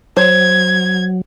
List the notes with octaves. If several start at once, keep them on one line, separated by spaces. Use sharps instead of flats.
F#3 C5 G#6